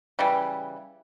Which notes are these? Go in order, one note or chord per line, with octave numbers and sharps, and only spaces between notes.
C#3 E3 G3